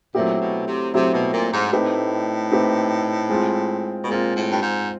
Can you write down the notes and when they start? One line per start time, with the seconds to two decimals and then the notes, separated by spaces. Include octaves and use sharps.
0.15 A#2 F#3 A3 C4 E4 G4
0.41 B2
0.67 C3
0.93 C3 F#3 A3 C4 E4 G4
1.13 B2
1.33 A#2
1.52 G#2
1.72 A2 A3 C4 D#4 G4 B4
2.51 A3 C4 D#4 G4 B4
3.29 G#3 C4 F4
4.04 B2
4.08 A#2 G#3 C4 F4
4.35 A2
4.51 G2
4.61 G#2